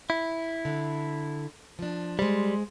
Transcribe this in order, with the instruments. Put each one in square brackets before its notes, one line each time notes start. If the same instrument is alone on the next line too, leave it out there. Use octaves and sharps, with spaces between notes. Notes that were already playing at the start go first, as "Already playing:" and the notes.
[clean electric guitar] E4
[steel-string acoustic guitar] D3
F3 D4
[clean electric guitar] G3 [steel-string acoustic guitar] G#3 C5